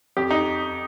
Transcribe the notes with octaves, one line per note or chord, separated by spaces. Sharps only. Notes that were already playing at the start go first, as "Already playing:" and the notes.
F2 G4
D#4